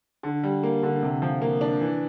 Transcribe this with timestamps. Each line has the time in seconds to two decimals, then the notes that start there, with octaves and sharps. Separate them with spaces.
0.23 D3
0.43 G3
0.63 A#3
0.83 D3
1.03 C3
1.22 F3
1.42 A#3
1.61 D4
1.81 E3